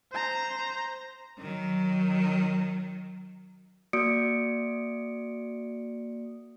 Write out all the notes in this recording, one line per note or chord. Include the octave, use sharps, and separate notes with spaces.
C5 A#5
D#3 F#3
A#3 F#4 D5 D#6 C#7 D7